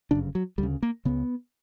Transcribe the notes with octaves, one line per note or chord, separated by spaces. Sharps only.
G1 F#2 C#3 D4
F#3
D2 C#3 G3
A#3
C#2 C#3 B3